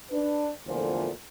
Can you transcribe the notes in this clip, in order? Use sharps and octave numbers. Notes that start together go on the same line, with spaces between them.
D4 B4
E2 A#2 D3 F3 A3 C5